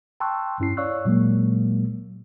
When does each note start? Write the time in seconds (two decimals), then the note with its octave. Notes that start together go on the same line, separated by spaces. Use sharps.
0.20 G5 A5 C6 C#6 E6 F#6
0.60 G2 C#4 E4 C7
0.77 C#5 D5 F5 C#6 E6 F#6
1.05 A#2 F#3 G#3 A#3